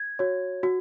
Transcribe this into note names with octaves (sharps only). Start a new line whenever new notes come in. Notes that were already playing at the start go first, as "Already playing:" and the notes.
Already playing: G#6
F#4 C#5
F#4